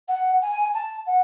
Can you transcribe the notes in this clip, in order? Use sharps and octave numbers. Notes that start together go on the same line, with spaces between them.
F#5
G#5
A5
F#5